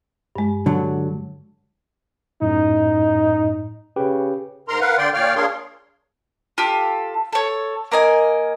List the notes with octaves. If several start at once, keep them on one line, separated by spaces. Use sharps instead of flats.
G2 G#3
D3 F#3
F#2 A2 D#4
C#3 G4 B4 G5
G#2 A#4 A#5 C6
A#4 B4 F5 F#5
D3 D5 G5 C6
A#2 C#5 D5 F5 G5 F6
D4 G#4 A#4 C#5 F5 C6
F4 G4 A4
A4 C#5
A#3 A#4 D#5 G#5